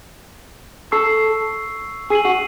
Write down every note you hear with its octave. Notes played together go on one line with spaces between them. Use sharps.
A4 C#6 E6 C7
G#4 E6 C7 D#7 F#7
F#4